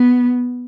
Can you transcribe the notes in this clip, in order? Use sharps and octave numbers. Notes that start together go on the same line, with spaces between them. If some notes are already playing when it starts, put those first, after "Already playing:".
Already playing: B3